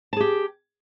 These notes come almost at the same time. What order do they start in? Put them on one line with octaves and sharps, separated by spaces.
A5 G#4 G4